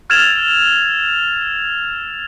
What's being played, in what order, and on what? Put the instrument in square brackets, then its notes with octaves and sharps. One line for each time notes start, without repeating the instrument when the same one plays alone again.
[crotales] E6 F6 G#6 A6 E7 F7